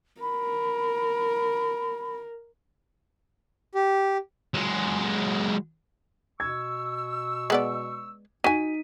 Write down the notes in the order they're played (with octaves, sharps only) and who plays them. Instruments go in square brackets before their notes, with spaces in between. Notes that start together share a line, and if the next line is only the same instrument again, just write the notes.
[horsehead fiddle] A#4 [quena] B5
[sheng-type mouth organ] G4
[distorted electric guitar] F#3 G#3
[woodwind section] B2 C#6 E6 [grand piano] G#6
[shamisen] G#3 B3 D5
[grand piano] D#4 B6 D#7 [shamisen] F#4 G#5